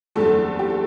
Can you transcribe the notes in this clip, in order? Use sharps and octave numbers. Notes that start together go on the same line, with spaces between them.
F#1 E2 D3 G3 A3 A4
G4
A4